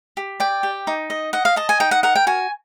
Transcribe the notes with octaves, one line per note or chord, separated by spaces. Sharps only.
G4
D5 G5
G4
D#4
D#5
D#5 F#5
F5
D#5 A5
G#5
D#4 G5
F#5
A#4 F#5
G5
F#4 G#5